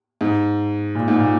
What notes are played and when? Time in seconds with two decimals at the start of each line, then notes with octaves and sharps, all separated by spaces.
0.21 G#2
0.95 A#2
1.08 G#2
1.20 A#2